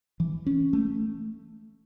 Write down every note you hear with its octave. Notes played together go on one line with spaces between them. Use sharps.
E3
C#4
A3